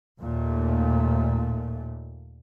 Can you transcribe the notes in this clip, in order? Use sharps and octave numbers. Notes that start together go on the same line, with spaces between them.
D#2 A#2 A3